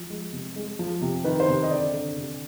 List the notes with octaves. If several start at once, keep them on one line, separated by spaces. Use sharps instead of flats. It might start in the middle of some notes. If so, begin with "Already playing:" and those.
Already playing: F3
G#3
C3
G#3
F3
C3
D#3 B4
C5
C3
D#5
D3 D5
D3
C3